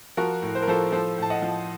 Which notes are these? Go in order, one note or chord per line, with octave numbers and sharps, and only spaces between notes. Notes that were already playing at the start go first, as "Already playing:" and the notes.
F3 F#4 A#4
A2
C5
A#4
F3 A4 C5
F3 A4 C5
A2 A5
D#5 F#5
F3